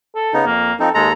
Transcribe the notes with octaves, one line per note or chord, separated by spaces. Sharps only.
A4
C#3 B3 D#4
F2 A#3
F3 C4 D#4 A4
D#2 G#3 A4 A#5